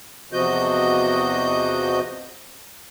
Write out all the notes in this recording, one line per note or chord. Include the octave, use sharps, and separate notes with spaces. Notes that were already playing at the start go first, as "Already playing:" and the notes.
E2 C3 F3 F#4 D#5 G6